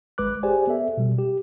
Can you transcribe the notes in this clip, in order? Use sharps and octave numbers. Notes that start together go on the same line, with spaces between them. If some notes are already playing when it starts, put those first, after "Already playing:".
G#1 G#3 B4 D6 F#6
G4 G#4 C5 D5 G#5
B3 A4 E5
B2 G3
G4